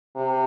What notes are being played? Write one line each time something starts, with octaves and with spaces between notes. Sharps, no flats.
C3